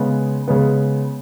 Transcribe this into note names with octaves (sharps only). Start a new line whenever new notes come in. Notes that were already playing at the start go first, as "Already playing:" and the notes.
Already playing: C#3 G#3 B3
C#3 G#3 B3